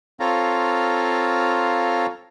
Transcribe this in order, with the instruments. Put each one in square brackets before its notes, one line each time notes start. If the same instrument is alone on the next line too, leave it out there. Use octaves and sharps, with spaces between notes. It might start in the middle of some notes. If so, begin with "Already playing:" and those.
[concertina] C4 F4 A4 C#5 F5 A#5